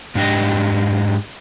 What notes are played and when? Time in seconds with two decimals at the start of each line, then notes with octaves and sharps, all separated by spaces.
0.15 G#2 D4 G4 D#5